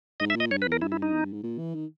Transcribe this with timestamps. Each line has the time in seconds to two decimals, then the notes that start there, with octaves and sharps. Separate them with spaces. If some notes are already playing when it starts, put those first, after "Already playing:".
0.20 G#2 D#5
0.30 E5
0.35 A#2
0.40 D#5
0.51 G2 C#5
0.62 B4
0.66 E2
0.72 A#4
0.82 G2 E4
0.92 E4
1.02 D#4
1.12 E2
1.23 G2
1.33 G#2
1.43 A#2
1.58 E3
1.74 D#3